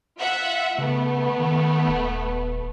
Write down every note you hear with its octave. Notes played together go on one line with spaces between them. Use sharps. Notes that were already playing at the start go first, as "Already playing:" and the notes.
F4 E5 F#5
C#3 A3 B3
D#3
D#1